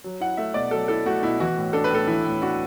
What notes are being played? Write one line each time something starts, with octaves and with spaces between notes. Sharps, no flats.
F#3
E4 F#5
A3 E5
B2 D5
F#3 A4
E4 A4
A3 F#4
B2 E4
E3 F#4
A2
D4 A4
B4
A2 A4
E3 E4
A2
D4 F#4